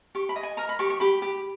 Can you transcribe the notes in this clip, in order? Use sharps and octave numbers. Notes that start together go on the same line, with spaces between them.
G4 C#6
B5
D#5
G#5
A#4 A#5
B5
G4 C#6
C#6
G4 B5
G4